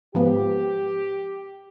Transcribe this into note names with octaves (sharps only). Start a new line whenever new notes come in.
G#2 F3 B3 G4